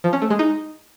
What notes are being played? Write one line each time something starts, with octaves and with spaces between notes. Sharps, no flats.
F3
C#4
A3
G#3
D#4